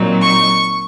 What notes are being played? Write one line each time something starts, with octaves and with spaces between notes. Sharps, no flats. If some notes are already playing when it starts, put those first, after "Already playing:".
Already playing: A#2 F#3 C4 D#4
C#6